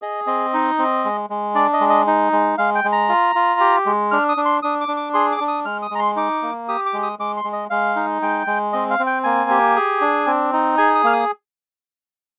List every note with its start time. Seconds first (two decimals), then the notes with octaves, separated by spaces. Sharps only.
0.02 G#4 D#5
0.27 C4 D#5
0.54 D#4
0.79 C4
1.05 G#3
1.30 G#3
1.55 D4 D5
1.73 D#5
1.81 G#3
1.90 D#5
2.07 D#4
2.32 G#3
2.58 G#3 F5
2.75 G5
2.84 G#3
2.92 A#5
3.09 F4
3.35 F4
3.60 G4
3.86 G#3
4.11 D4 F6
4.29 D#6
4.37 D4
4.45 C6
4.63 D4 D#6
4.81 D6
4.88 D4
4.97 D6
5.14 G#4 C6
5.32 D6
5.40 D4
5.48 D#6
5.65 G#3 F6
5.82 D#6
5.91 G#3 A#5
5.99 C6
6.16 D#4 D6
6.42 A#3
6.68 G4 D#6
6.86 D6
6.93 G#3
7.03 D#6
7.19 G#3 D6
7.37 C6
7.44 G#3
7.53 D#5
7.70 G#3 F5
7.96 D#4
8.22 G#3 G5
8.47 G#3
8.73 C4 D#5
8.90 F5
8.99 C4
9.07 G5
9.24 A#3 G#5
9.50 G4
9.76 G#4
10.01 D4
10.27 C4
10.53 D#4
10.78 G#4 G#5
10.95 D#6
11.04 A#3 F6
11.13 D#6